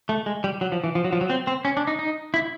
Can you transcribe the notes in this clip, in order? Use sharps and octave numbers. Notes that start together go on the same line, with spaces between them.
A3
G#3
G3
F#3
F3
E3
F3
F#3
F3
F#3
C4
C4
C#4
D4
D#4
D#4
E4